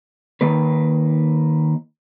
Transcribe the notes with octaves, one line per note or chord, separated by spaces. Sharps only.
D#3 A#3 B4